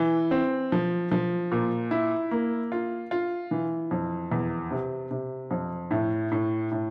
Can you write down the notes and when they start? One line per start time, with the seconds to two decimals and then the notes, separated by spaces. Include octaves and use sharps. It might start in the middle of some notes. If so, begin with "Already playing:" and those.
Already playing: E3
0.31 C4
0.72 F3
1.12 F3
1.52 A#2
1.91 E4
2.31 A#3
2.72 F4
3.11 F4
3.51 E3
3.91 F2
4.32 E2
4.71 C3
5.11 C3
5.51 F2
5.91 A2
6.31 A2
6.71 A2